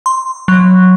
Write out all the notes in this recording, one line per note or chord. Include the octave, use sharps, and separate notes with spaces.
C6
F#3